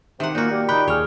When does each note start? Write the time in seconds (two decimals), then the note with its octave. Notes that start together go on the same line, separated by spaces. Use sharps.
0.20 C3 D#3 F#5
0.35 A#2 A#3 D#4 F#4
0.50 A#2 G3 A#3 G4
0.69 D#4 G5 B5 F#6
0.88 D#2 G#4 C#5 F6